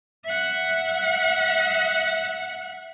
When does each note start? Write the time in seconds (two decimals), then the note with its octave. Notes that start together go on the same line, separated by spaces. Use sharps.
0.24 E5 F#5